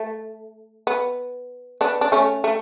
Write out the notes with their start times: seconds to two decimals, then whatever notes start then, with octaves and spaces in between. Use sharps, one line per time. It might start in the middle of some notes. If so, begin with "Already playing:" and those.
Already playing: A3
0.87 B3
1.81 B3 D4
2.01 D4
2.12 A3 C#4
2.44 A3